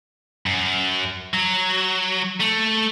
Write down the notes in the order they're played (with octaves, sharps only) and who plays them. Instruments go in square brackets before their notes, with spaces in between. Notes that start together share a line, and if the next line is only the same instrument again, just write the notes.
[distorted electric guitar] F#2
F#3
A3